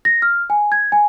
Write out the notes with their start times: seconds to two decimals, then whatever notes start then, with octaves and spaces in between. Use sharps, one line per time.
0.05 A#6
0.22 F6
0.50 G#5
0.72 G#6
0.92 G#5